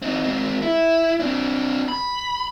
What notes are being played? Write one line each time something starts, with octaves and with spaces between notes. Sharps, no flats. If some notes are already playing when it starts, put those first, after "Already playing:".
C4 D#4
G#3 C4
E4
C4 D4
B5